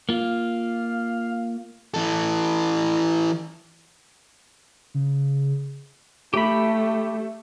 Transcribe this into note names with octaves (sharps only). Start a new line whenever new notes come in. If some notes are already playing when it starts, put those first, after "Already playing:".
A#3 F4 F5
E3 A4
C#3
A3 G4 B5